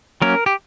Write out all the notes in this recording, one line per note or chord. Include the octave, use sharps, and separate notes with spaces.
F#3 A#3 C#4 A#4
G4